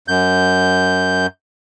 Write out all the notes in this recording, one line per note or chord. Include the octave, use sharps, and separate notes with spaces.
F#2 G6